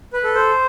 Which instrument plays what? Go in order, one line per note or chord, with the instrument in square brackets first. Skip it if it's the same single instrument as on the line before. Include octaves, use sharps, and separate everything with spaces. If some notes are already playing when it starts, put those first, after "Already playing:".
[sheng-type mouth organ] B4
A4
C5